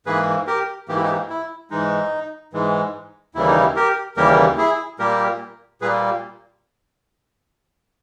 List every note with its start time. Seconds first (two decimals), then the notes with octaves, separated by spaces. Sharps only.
0.06 G#2 E3 A#3 G#4 B4
0.47 G4 A#4
0.88 G#2 E3 A#3 G4
0.96 E4
1.03 D#4 G4
1.30 E4
1.70 G#2 E3 G#3 D#4
2.53 G#2 E3 G#3
3.35 D#2 C#3 E3 G3 A#3 E4
3.47 D#4
3.60 E4
3.76 G4 A#4
4.17 D#2 C#3 E3 G3 A#3 G4 A#4
4.58 E4 G#4
4.99 A#2 G3 A#3 G4 A#4
5.81 A#2 G3 A#3 G#4 B4